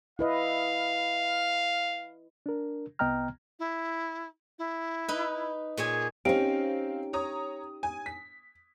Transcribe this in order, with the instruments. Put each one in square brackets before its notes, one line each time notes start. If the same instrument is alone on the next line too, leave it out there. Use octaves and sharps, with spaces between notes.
[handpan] E4 B4 D#5 [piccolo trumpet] F5
[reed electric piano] D4 A#4
C2 B3 D#5 G5 A#5 F6
[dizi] E4
E4
[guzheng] D#4 B4
[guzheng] A#2 C#5 G#5 [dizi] G#4
[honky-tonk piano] C4 F5 [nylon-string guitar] C#4 D#4 [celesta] G4 G5 D7
[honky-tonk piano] C#5 A#5 D#6
G#5
B6